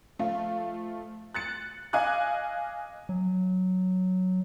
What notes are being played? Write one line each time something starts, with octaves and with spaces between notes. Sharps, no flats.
F3 A3 F4
F#6 A6 C#7
D#5 F5 G#5 D6 F#6
F#3